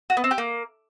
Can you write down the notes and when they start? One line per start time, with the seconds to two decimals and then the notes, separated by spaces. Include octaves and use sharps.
0.10 F#4
0.17 B3
0.24 C4
0.31 G4
0.38 A#3